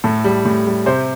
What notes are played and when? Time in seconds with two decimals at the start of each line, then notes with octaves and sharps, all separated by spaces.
0.04 A2 A4
0.24 G3
0.45 A2
0.66 G3
0.86 C3 C5